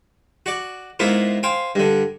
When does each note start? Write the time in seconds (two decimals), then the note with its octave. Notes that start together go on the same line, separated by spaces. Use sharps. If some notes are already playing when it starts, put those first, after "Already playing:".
0.46 F#4 D5
0.99 G#2 A#3 B3 E4 F4
1.43 C5 F5 G5 G#5
1.75 G2 D3